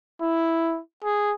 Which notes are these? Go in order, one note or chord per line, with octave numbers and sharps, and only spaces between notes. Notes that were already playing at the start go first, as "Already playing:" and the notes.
E4
G#4